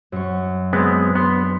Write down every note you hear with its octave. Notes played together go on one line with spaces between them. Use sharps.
F#2 C#6
G#3 B3 C4 D6
B3 D4 B4 C6